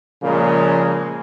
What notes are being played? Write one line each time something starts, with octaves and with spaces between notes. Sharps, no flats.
A#2 C#3 F3 G#3 A#3